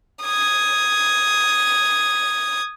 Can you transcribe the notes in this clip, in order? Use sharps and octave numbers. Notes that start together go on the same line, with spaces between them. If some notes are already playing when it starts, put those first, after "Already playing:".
D#6 G#6